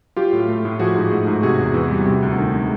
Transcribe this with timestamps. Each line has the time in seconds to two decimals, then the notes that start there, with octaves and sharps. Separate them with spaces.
0.16 F#3 F4 G4
0.33 A2
0.48 A3
0.65 A2
0.79 F3 F#4 G#4
0.95 G#2
1.12 A3
1.27 G#2
1.43 C3 F#4 G#4
1.59 E2
1.74 E3
1.91 G3
2.06 C3
2.23 D2
2.38 D#3
2.54 G#3